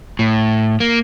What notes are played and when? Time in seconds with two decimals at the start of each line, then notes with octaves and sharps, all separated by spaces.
0.19 A2
0.80 A#3